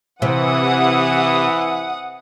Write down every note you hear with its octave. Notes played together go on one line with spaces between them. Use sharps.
C3 E3 F#5 D#6